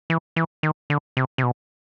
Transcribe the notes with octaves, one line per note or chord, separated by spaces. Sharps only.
E3
E3
D#3
D3
C3
C3
B2